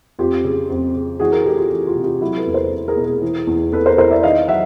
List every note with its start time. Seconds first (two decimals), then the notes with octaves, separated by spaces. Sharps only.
0.19 F2 F4 G4
0.44 C#3
0.70 F2
0.95 C#3
1.20 E3 F#4 G#4
1.32 G#4 A#4
1.45 E3 G4 A4
1.58 F4 G4
1.71 E3
1.87 F4 G4
1.95 C3
2.04 F4 G4
2.21 F#3 E4 F#4
2.37 A4 B4
2.46 E2
2.54 A#4 C5
2.72 E2
2.88 G#4 A#4
2.97 B2
3.05 G#4 A#4
3.22 E3
3.47 E2
3.72 E2 A4 B4
3.86 A#4 C5
3.98 E2 A#4 C5
4.11 D5 E5
4.23 D#3 D#5 F5
4.48 F#3 E5 F#5